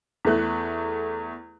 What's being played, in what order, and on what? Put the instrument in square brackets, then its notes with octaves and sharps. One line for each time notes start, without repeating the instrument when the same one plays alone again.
[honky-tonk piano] E2 A3 F#6